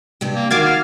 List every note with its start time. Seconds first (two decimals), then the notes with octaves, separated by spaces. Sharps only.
0.21 G2 C3 G4
0.36 A#3
0.51 D#3 F#4 F5 D6 G#6 A6
0.63 F5